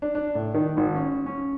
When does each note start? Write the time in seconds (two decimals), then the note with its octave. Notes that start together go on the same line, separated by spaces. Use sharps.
0.02 D4
0.15 D4
0.35 A2
0.54 D#3
0.77 G#1
0.94 C#4
1.26 C#4